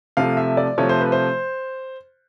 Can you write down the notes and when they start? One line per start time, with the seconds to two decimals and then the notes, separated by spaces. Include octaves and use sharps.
0.17 C3 F3 A3 F5
0.37 E5
0.57 D5
0.78 C3 F3 A3 C#5
0.89 C5
1.01 B4
1.12 C5